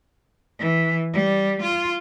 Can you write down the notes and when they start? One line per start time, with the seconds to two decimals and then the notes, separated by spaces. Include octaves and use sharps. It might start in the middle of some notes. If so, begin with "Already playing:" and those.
0.60 E3
1.14 G3
1.62 F4